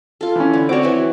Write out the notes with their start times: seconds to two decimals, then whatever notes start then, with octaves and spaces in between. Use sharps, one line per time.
0.21 F4 A4
0.36 E3 C#4
0.53 D3
0.69 C4 F#4 C#5 D5 D6
0.83 E3 F#3